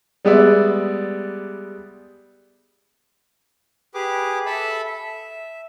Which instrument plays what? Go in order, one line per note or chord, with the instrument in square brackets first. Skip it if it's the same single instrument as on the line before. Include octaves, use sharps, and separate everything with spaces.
[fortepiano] G3 G#3 B3 G#4 D5 E5
[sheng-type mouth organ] G4 G#4 B4 D6
A4 E5 A5 B5
E5